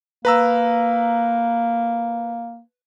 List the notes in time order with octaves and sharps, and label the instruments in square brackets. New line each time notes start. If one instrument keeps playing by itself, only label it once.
[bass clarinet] A#3 [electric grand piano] B4 A#5 E6